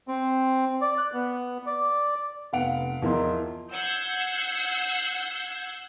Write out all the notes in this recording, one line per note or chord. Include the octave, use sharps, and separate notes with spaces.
C4
D5
F#6
B3
D5
F1 B3 F5 F#5 D7 F7
E2 F3 E4 A#4 D#5 C6
F#5 E6 G6 G#6 C7